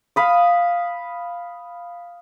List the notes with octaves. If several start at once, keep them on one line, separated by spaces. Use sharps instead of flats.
F5 B5 D#6